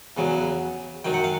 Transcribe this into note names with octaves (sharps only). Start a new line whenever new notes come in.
E2 C#3 F#3
F#2 D#3 F#3 G5
F#5
F5